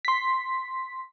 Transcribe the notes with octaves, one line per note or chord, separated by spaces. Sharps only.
C6 B6